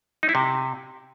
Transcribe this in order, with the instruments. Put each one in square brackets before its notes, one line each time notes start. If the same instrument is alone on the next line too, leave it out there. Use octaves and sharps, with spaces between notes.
[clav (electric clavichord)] D#4
E4
C3